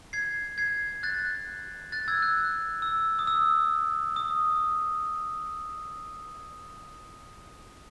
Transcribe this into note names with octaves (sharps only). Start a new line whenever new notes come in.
G#6 C7
G#6 C7
F#6 A6
F#6 A6
E6 G#6
F#6
E6
D#6
E6
D#6